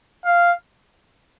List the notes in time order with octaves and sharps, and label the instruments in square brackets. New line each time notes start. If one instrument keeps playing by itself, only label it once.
[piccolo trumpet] F5